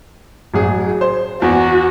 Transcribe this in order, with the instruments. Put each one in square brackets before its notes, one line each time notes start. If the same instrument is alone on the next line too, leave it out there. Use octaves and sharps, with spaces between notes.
[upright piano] A1 F#3 G#4
C5
[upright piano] E2 [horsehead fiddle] F#4